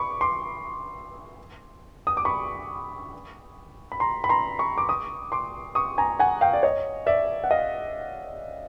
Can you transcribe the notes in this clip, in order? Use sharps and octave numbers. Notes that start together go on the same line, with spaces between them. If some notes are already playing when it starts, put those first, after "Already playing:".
Already playing: B5 C#6 D6
C6 D6
D#6
D6
B5 C#6
B5
A#5 C6
B5
A#5 C6
B5 C#6
D6
C#6 D#6
C6 D6
C#6 D#6
G#5 A#5
F#5 G#5
F5 G5
D5
C#5 D#5
D5 E5
F#5
D#5 F5